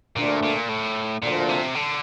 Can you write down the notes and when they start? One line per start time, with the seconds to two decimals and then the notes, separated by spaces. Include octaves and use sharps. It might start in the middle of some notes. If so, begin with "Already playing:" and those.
0.16 D2 A#2 D3 A3 D4
0.43 A#2
0.69 A2
1.23 D2 A#2 D3 F3 A#3
1.49 C3
1.75 D3